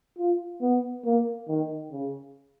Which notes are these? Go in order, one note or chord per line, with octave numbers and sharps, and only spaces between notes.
F4
B3
A#3
D#3
C#3